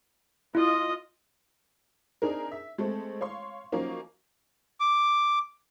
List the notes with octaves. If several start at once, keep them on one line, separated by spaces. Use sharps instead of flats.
E4 F4 D#5
C4 D4 D#4 G#4 A#4
E5
G#3 A3 C4
C#5 F5 C6
F3 F#3 A#3 C#4 D#4
D6